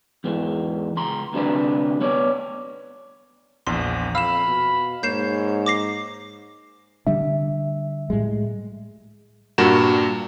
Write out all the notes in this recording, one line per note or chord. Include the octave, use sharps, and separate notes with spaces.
E2 G#2 E3
C#2 A#5 C6
D2 C3 G3 D4 B4
B3 C#5 D5
A#1 E2 C6
F2 F5 B5 E6 E7
B2
G#2 A#3 C#5 G6 C7 E7
D6 A#6 C7
D3 G3 D4 E5
A2 G3 G#3
G2 A#2 F#4 A#4 E7